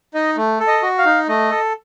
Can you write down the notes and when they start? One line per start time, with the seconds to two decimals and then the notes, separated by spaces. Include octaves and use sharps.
0.14 D#4 D#5
0.37 A3
0.60 A4
0.67 D#5
0.82 F#4
0.98 F5
1.05 D#4
1.28 A3 D#5
1.51 A4